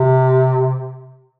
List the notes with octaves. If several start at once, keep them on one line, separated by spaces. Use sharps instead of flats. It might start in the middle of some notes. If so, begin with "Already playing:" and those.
Already playing: C3